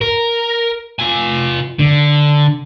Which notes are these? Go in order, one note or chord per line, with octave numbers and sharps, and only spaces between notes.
A#4
F4 G#5
D3